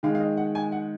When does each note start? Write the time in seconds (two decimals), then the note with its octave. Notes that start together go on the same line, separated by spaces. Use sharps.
0.03 D#3 G#3 F5
0.15 F5
0.20 D#5
0.37 F#5
0.55 G#5
0.72 F#5